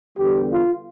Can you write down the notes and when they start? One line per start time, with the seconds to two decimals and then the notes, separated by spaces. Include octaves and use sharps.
0.18 E2 D3 G3 B3 G4
0.50 F4